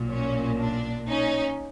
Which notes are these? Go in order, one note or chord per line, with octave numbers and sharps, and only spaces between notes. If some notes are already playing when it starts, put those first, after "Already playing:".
Already playing: B1 A#2
C#4
D4
C#4 D#4